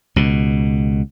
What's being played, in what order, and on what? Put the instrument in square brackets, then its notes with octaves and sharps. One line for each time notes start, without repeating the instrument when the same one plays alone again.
[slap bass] C#2 B2